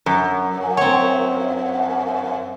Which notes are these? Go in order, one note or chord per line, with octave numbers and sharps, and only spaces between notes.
F#2
C4 C#5